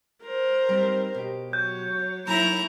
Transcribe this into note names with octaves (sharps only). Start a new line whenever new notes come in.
A#4 C5
G3 C4 D#4
B2 G4
F#3 C#5 G6
F#3 A#3 D#4 E4 C#5 G#5 A#5